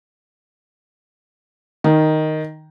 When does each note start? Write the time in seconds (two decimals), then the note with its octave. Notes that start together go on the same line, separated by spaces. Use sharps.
1.84 D#3